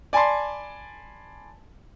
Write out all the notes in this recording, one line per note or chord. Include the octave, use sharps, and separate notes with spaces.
D5 G#5 A5 B5 C6